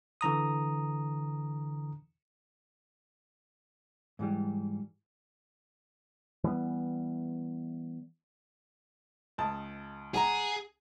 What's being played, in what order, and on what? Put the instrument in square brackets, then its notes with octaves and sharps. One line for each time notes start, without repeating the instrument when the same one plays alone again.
[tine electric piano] D3 E3 A#5 D#6
[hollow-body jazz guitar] G#2 E3 G3
[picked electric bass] E3 G3 G#3 B3
[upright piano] C#2 A5 D#6
[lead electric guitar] G#4 [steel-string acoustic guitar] F#5 G#5 A#5